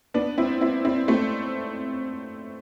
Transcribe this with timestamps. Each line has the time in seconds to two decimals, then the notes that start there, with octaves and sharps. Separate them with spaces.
0.14 B3 D4
0.38 C4 E4
0.61 C4 E4
0.85 C4 E4
1.08 A3 C4